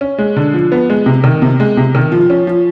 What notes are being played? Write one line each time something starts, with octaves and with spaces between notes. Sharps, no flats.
C#4
G#3
D3
F3
B3
G#3
C3
D#3
C3
G#3
C3
D#3
F3
C#4
F3